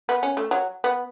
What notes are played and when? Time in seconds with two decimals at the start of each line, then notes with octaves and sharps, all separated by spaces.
0.09 B3
0.23 C#4
0.37 A3
0.51 F#3
0.84 B3